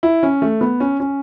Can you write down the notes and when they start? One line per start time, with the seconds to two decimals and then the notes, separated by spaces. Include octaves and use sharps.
0.03 E4
0.23 C#4
0.42 A3
0.61 B3
0.80 C#4
1.00 C#4